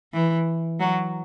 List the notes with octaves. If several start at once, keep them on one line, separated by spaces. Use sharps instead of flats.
E3
F#3